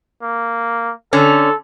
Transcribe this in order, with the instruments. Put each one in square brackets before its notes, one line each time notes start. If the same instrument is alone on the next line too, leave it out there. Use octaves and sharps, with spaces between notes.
[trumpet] A#3
[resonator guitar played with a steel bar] D3 C#4 [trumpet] A4